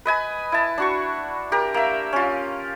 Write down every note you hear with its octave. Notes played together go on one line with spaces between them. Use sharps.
B4 D#5 G#5 B5
E4 A5
D4 F#4 C#6
G4 A#4
A#3 E5
C#4 F4